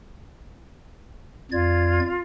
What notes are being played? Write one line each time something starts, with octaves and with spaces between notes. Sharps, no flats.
F2 F4 D5 G#6